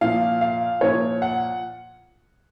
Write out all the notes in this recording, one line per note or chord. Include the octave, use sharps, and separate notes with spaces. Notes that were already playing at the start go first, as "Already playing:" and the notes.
A#2 F3 F5
F5
A#2 F3 C#5
F#5